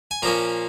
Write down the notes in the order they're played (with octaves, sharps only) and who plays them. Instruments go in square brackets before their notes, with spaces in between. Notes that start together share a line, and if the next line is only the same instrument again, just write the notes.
[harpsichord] G#5
A#2 F3 A#3 C#4 A#5